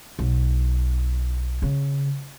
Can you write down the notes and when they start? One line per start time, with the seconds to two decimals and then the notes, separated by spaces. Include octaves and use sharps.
0.19 B1
1.62 C#3